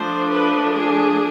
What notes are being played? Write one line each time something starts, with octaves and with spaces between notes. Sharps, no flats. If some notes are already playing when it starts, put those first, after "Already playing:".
Already playing: F3 A3 D4 C5
B4
G#4